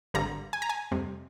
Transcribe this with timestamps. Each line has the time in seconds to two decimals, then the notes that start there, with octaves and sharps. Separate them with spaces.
0.14 G#1 G2 D3 G3 A#5
0.53 G#5
0.62 A#5
0.69 G#5
0.91 F2 C3 G3